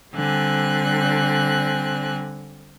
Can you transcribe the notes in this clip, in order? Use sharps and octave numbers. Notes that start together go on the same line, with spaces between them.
D3 G3 C4 G#5 F#6